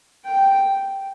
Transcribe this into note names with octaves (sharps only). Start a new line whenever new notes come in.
G5